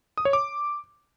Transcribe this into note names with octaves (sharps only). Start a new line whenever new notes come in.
D#6
C#5
D6